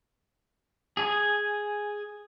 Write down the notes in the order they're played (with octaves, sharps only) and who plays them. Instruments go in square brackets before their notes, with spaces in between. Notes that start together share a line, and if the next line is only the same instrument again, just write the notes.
[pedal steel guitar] G#4 G#5